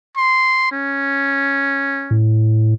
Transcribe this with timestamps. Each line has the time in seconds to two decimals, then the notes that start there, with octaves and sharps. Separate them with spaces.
0.17 C6
0.72 C#4
2.11 A2